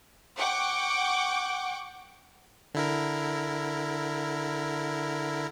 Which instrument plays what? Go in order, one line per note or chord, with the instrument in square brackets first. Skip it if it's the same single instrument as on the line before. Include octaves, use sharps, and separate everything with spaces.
[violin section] F#5 G5 C#6 D6
[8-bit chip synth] D3 E4 A#4